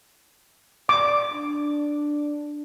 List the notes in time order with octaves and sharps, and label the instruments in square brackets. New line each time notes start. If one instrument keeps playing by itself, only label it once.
[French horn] D5 [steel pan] D6
[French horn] D4